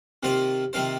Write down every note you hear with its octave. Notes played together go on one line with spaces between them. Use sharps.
C3 D#3 A#3 F4 C5
C3 D#3 A#3 F4 C5